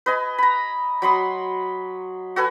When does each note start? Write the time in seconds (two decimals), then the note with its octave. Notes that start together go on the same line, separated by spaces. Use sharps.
0.06 B4 D#5 G#5
0.38 A#5 B5
1.02 F#3 B5 C6 D#6
2.36 F#4 A4 B4 G#5